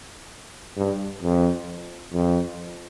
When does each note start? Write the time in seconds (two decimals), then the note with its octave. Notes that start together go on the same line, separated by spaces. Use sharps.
0.77 G2
1.22 F2
2.14 F2